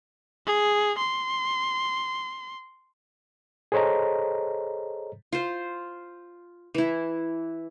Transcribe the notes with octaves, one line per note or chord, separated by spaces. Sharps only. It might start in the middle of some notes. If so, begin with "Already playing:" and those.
G#4
C6
G#4 A4 C5 C#5 D#5 A#5
F4 C5
E3 E4